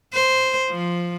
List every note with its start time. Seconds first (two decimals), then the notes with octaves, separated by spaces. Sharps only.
0.13 C5
0.70 F3